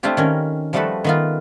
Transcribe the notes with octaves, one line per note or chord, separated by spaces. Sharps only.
A3 C4 D4 E4 F4 G4
D#3 C#4 A#4
F3 G3 A3 F#4 A4 B4
D#3 B3 F4